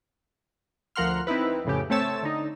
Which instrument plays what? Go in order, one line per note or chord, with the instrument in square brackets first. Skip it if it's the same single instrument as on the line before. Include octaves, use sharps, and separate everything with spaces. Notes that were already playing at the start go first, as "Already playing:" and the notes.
[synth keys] D2 F3 A#4 F#5 C6 F6
C4 D#4 E4 B4
F2 A2 C#3 G4
A3 C4 C#5 A5 E6
D3 D#4